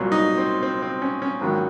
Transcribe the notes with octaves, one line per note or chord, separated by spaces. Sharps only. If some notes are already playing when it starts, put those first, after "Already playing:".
Already playing: C2 A#2 F#3
D#4
C4
C4
C4
C#4
C#4
A#1 G#2 D#3 F#3